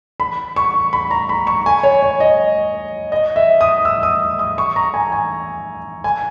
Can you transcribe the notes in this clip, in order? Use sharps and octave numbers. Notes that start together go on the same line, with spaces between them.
B5
C#6
B5
A#5
B5
C#6
G#5
C#5
C#5
D#5
D#5
E5
D#6
E6
D#6
D#6
C#6
A#5
G#5
G#5
G#5